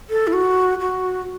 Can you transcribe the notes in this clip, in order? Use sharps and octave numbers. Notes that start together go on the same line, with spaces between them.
A4
E4
F#4
F#4